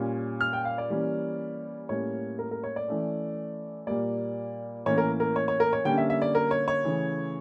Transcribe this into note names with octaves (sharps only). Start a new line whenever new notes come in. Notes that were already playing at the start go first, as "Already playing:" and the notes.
Already playing: A#2 G3 C#4
F6
G5
F5
D5
E3 G3 A#3 C#4
A2 G3 A#3 C#4 C#5
A#4
A#4
C#5
D5
E3 A3 C#4
A#2 G3 A#3 D5
A2 E3 A#3 C#4 C#5
A#4
A#4
C#5
C#5
A#4
C#5
D3 G3 A#3 C#4 G5
E5
E5
D5
A#4
C#5
C#5
C#3 E3 A3